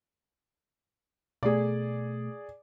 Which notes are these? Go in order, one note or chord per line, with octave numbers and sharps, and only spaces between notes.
B2 A3 G#4 D5